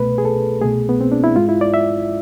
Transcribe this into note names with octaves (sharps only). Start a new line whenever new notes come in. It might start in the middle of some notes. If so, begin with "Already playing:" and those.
Already playing: C2 B2 A3 B4
G#4
A4
C2 B2 A3 G#4
B3
C4
D4
E4
G#2 G#3 F4
E4
D5
E5